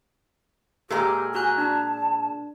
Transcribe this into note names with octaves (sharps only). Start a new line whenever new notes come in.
A#2 G#3 G4 A4 A#4
F#4 G#5 A#5 F#6
D4 A5